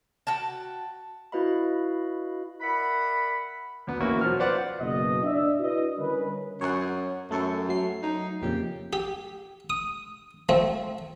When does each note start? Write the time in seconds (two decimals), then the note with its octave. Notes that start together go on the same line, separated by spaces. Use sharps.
0.27 F#4 G5 A5
1.32 E4 F#4 B4 D#5 F5 B5
2.61 A#4 D5 E5 F#5 B5
3.87 D2 B3
4.00 E3 A#3 C#4 E4 F#4
4.21 B2 F3 F#3 F6
4.39 F4 B4 C5 D5 F5 F#5
4.79 F#1 B2 D#5
5.24 D4 D5 E5
5.60 E4 F#4 B4 D#5
5.98 D3 G3 C#4 A#4 B4
6.61 F#2 C#5 F#5
7.31 F#2 A3 A4 C#6
7.69 F#3 A3 C7
8.03 D#4
8.42 F2 A#2 C#3 G4
8.93 G4
9.70 D#6
10.49 F3 A3 C4